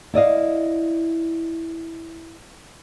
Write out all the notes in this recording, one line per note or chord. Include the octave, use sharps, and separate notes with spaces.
E4 D5 D#5 F5